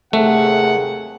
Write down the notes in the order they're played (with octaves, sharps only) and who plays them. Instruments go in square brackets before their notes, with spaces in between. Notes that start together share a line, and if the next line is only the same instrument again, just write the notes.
[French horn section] D#2 C3 G#4 [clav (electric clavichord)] A3 [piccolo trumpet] F#5